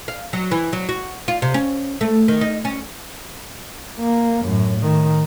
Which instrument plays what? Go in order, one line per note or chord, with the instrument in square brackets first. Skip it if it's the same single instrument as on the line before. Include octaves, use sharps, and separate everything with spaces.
[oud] F5
F#3
E3
F#3
F#4
F4
C3
C#4
A3
D#3
D#4
C#4
[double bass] A#3
F#2 A2
A2 D#3